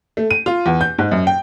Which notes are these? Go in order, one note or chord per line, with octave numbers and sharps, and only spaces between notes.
A3
D#7
F4
E2
G6
G#2
F#2
G5